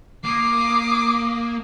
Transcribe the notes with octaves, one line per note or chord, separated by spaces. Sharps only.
A#3 D6 D#6 C7